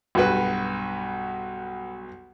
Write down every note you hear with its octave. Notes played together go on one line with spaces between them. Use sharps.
B1 G2 F#4 B4